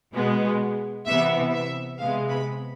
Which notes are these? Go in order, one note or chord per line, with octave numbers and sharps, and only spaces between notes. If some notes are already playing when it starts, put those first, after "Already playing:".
B2 G#3 B3
C3 E3 B3 E5
E5
C3 G#3 B3 F5
B5